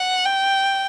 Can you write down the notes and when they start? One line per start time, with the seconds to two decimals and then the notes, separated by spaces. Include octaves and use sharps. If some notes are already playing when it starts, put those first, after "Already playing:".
Already playing: F#5
0.26 G5